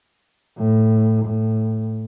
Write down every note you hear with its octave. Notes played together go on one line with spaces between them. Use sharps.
A2
A2